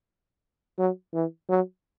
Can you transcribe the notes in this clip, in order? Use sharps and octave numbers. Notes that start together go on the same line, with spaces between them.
F#3
E3
F#3